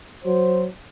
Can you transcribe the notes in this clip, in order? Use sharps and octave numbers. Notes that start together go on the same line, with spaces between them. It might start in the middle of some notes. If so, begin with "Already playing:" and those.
F#3 C5